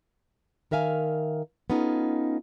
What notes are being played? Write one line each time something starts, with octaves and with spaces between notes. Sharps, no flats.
D#3 A#4 E5 F5 G#5
B3 C#4 D#4 F4 A4